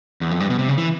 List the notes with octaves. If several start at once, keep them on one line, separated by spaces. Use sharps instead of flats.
E2
F2
G2
B2
C3
C#3
E3